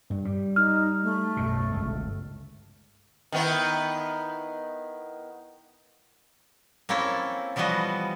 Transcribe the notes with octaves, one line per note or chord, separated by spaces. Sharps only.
G2
G3
D#4 F6
A3
B1 F#2 B2
G1 C#2
D#3 B3 E4
A#3 C4 C#4 E4 A4
E3 F3 G3 B3 F#4 D#5